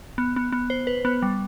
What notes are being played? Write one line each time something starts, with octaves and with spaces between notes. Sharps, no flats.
B3
B3
B3
C5
B4
B3
G3